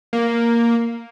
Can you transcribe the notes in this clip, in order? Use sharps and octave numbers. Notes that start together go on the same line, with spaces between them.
A#3